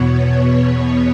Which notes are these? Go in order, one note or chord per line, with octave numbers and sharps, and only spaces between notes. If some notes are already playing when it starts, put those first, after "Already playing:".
Already playing: E2 B2 B3 C#5
C#5